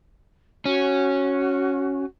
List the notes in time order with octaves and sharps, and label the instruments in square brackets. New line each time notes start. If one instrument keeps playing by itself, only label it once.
[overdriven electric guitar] C#4 [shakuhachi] F#4